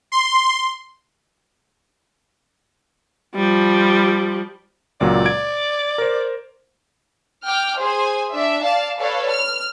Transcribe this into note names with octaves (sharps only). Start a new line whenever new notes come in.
C6
F3 G3
C#2 A#2 F#3 D5
G#6 D7
A#4 C5
G5 D6 F6
G#4 C5 G#5
D4 E5
D5 F5 A5
A4 B4 C#5 D5 F5
F6